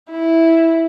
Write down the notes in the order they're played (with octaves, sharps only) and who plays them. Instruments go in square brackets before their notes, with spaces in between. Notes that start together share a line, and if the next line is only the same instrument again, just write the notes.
[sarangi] E4